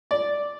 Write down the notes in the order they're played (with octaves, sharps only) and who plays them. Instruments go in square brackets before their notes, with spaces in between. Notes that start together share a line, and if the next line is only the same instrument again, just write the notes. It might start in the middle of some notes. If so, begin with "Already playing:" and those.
[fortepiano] D5